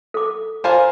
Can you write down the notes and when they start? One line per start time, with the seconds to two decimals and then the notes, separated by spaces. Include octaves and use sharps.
0.14 A4 D6
0.64 F4 A#4 C5 F5 G#5 B5